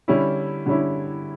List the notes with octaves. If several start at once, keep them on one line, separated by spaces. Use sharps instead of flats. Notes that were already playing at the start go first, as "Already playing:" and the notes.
D3 G3 C#4 E4
D3 G3 C#4 E4